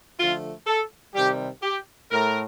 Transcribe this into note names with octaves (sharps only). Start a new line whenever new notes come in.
D3 F3 A3 F4
A4
C3 D#3 G3 G4
G4
A2 A3 A#4